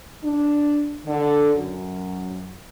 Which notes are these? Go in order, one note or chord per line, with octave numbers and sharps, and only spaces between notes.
D4
D3
F#2